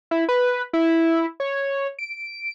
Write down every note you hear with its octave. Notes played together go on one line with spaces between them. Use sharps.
E4
B4
E4
C#5
D7